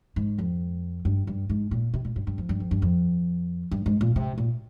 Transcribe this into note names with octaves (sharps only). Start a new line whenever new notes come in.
G#2
F2
G2
G2
G#2
A#2
C3
A#2
G2
G2
F2
G2
F2
G2
F2
G2
G#2
A#2
C3
A#2